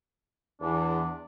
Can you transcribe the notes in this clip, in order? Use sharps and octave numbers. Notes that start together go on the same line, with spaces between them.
E2 D4